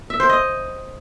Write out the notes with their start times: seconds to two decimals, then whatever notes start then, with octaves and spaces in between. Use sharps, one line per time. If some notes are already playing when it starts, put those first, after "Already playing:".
0.10 E5
0.20 C5
0.29 D#5